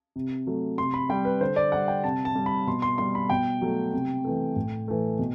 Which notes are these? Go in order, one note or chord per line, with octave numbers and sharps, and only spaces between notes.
C3
F#3 A3
C3 C6
B5
G3 G5
B4
D3 C5
D5
G3 F#5
G5
C3 A5
A5
G3
B5
B2 C6
C6
G3 C6
B5
B2 G5
F#3 A3
C3
E3 A3
A2
E3 A3
B2